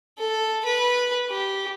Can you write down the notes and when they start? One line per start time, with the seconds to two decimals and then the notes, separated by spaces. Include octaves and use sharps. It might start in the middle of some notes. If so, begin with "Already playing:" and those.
0.18 A4
0.65 B4
1.30 G4